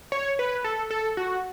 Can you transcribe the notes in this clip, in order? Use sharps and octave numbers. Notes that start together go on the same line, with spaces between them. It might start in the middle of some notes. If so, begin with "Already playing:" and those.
C#5
B4
A4
A4
F#4